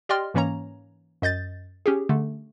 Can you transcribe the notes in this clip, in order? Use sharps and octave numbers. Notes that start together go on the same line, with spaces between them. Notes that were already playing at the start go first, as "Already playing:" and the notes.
G4 D5 D#5 G5 C6 F6
G#2 E3 A#3 C#4 C#5 A#5
F#2 D#5 G6 A6
C#4 G4 G#4
D3 A3